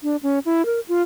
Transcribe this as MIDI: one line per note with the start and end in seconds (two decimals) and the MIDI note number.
0.03 0.16 62
0.23 0.39 61
0.46 0.65 64
0.66 0.80 70
0.88 1.02 65